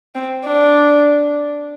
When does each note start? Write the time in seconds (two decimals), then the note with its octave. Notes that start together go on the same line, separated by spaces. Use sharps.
0.15 C4
0.45 D4